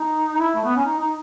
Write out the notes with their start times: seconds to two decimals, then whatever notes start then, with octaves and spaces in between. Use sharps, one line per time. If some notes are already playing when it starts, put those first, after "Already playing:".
Already playing: D#4
0.40 E4
0.55 A3
0.65 B3
0.75 C#4
0.85 D#4
1.00 D#4